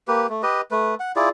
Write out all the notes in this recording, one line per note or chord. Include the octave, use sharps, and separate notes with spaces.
A#3 G4 B4
A3
G4 B4 D#5
A3 B4
F#5
E4 F4 G#4 D5